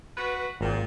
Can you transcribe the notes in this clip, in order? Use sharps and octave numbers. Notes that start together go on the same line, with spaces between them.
F#4 B4
G#1 A#2 G5